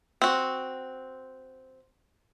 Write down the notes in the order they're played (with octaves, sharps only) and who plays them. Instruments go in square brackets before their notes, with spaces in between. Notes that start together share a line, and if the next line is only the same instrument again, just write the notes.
[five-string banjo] C4 F#4